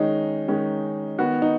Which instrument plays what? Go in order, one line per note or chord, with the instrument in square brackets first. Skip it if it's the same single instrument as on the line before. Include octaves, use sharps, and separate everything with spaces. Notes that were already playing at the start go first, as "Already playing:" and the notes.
Already playing: [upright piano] D#3 G#3 C#4 D#4
D#3 G#3 C#4
D#3 B3 F#4
D#4